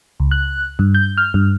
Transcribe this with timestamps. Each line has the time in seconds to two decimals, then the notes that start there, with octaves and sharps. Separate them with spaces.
0.20 C#2
0.31 F#6
0.79 G2
0.95 G6
1.18 F6
1.34 G2